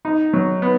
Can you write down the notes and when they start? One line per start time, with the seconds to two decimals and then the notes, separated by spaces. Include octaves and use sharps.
0.05 D#4
0.33 F#3
0.62 B3